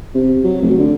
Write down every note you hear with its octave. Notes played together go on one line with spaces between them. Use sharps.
C3
F#3
F1
D3